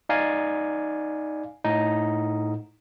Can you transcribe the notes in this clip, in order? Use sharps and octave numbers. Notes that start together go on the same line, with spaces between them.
D#4 D5 F5 G#5
A2 D#4